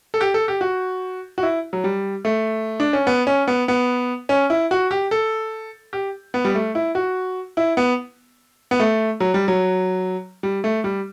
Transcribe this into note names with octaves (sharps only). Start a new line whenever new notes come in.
A4
G4
A4
G4
F#4
F#4
E4
F#3
G3
A3
D4
C#4
B3
C#4
B3
B3
C#4
E4
F#4
G4
A4
G4
B3
G3
A3
E4
F#4
E4
B3
B3
A3
F#3
G3
F#3
G3
A3
G3